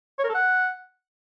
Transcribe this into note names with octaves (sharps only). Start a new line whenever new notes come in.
C#5
A#4
A4
F#5